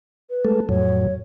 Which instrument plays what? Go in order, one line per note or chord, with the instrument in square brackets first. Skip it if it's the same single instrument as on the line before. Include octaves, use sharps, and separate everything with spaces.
[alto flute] B4
[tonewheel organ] G#3 A3 A4
[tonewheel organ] F2 A2 F#3 [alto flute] C#5